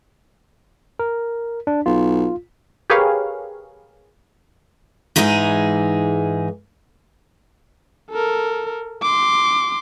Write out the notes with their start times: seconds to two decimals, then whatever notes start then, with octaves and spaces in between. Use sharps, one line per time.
0.99 A#4
1.67 D4
1.86 B1 F4
2.90 G4 G#4 A#4 B4 C#5 F5
5.16 G#2 E3 G#3 D#4 G#4
8.11 A4 A#4
9.02 C6 D6